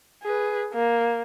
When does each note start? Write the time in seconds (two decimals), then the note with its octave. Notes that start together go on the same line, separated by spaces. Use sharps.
0.23 G#4 B4
0.73 A#3